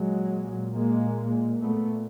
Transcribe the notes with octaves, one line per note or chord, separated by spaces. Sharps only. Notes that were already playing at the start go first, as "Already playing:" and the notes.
Already playing: A#2 F#3 G#3
G#3 A#3
A3 B3